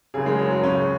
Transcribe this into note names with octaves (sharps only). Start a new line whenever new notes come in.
F#1 F#2 C#3 G#4
G#3
F#3
F#3
C#2 C#3 C#4